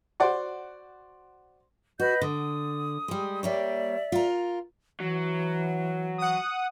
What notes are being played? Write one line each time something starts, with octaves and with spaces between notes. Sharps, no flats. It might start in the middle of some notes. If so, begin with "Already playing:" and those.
F#4 C5 D5 F#5 C6
F#4 B4 D#5 G6
D3 D#6
G3 G#3
G3 A#3 C#5 D5 E5
F4 A#4
E3 F#3
F#5 D#6